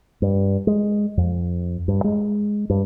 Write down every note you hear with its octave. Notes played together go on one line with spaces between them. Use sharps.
G2
G#3
F2
G2
G#3
G2